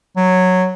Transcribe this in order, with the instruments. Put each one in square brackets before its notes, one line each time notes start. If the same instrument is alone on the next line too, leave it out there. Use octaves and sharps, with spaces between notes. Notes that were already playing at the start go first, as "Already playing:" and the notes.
[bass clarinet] F#3